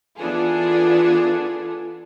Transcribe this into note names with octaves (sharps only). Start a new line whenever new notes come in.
E3 B3 D4 F4 G#4 A4